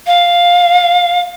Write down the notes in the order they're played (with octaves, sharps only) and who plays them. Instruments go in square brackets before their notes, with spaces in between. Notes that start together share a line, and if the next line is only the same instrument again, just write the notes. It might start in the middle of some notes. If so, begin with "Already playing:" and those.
[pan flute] F5